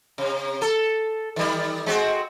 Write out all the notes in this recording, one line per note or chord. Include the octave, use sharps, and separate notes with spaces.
C3
A4
D#3 G3
G#3 C4 F#4